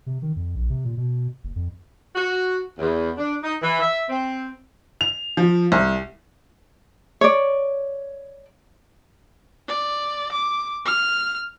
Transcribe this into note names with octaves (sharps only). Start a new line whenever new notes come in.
C3
D#3
F2
A#1
C3
A#2
B2
F#1
F2
F#4
E2
D4
D#4
E3
E5
C4
F7
F3
C2
C#5 D5
D5
D6
F6